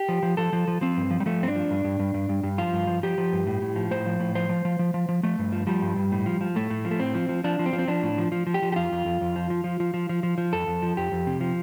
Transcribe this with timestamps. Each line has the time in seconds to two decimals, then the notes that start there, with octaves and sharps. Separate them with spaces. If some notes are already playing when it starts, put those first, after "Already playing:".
Already playing: G4
0.09 F3
0.23 F3
0.37 F3 A4
0.53 F3
0.68 F3
0.81 F3 C4
0.97 G2
1.11 F3
1.20 G3
1.26 F3 A3
1.41 G2 C4
1.48 D4
1.55 F3
1.71 G2
1.84 G2
1.99 G2
2.14 G2
2.29 G2
2.43 G2
2.58 F3 F4
2.73 G2
2.87 F3
3.03 F3 G4
3.18 F3
3.33 G2
3.47 A2
3.62 A2
3.76 F3
3.91 A2 C5
4.06 F3
4.20 A2
4.35 F3 C5
4.49 F3
4.65 F3
4.79 F3
4.94 F3
5.09 F3
5.23 F3 A3
5.39 G2
5.53 F3
5.67 F3 G3
5.82 G2
5.96 G2
6.12 A2
6.26 F3
6.41 F3
6.56 A2 A3
6.70 A2
6.85 F3
6.91 A3
7.00 A2 C4
7.15 F3
7.29 F3
7.44 F3 D4
7.59 F3
7.66 C4
7.73 F3
7.79 C4
7.88 F3 D4
8.03 A2
8.18 F3
8.32 F3
8.47 F3
8.54 G4
8.62 F3
8.72 G4
8.76 F2 F4
8.92 F2
9.05 F2
9.21 F2
9.36 F3
9.50 F3
9.64 F3
9.80 F3
9.94 F3
10.09 F3
10.23 F3
10.38 F3
10.53 F2 A4
10.67 F2
10.82 F3
10.97 F2 G4
11.12 F2
11.27 C3
11.41 F3